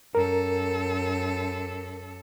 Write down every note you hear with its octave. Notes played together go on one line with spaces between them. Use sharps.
F#2 A4 A#4